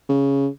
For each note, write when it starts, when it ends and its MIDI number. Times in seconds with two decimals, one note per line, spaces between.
0.09 0.48 49